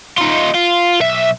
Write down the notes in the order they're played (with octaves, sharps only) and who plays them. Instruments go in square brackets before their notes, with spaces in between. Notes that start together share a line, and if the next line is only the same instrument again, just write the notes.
[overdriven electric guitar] D#4 F4
F4
B1 E5